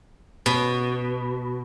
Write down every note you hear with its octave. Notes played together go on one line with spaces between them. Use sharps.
B2